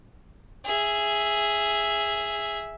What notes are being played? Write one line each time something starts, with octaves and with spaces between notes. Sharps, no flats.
G#4 E5